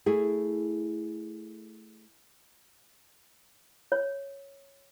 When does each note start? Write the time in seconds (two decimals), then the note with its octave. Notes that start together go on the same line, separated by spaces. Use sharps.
0.06 A3 E4 G#4
3.92 C#5